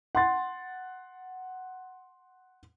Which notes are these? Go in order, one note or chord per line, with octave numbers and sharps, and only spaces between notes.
F#5 C6 A6